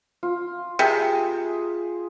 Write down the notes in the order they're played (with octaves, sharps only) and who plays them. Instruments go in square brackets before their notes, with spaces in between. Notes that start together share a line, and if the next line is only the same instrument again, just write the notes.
[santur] F4
[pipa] C3 [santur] G#4